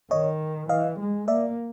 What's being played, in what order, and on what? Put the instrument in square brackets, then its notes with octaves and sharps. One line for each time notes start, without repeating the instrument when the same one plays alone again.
[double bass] D#3 [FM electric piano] C#5 D#5
[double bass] E3 [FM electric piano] D#5 F5
[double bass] G#3
[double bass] A#3 [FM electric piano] D5 E5